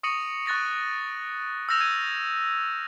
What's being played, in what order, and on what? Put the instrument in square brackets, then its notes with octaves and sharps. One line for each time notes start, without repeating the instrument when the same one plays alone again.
[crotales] C#6 D#6 A#6 C#7 D#7 F#7
C#6 F#6 A6 A#6 C#7
E6 F6 G6 A#6 E7 F7
G#6 D#7